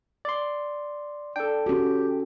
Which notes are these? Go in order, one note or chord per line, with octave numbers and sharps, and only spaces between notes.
D5 C6
D4 A4 G5
C#4 F#4 G4